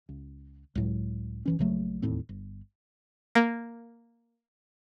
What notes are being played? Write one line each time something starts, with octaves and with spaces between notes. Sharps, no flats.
C#2
C#2 A2 F#3
F#1 E3 C#4
A#1 C#3 F#3 A3
E1 D#2 A2 C4
G1
A#3